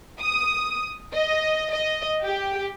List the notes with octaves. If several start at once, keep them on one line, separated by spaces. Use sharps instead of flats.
D#6
D#5
D#5
G4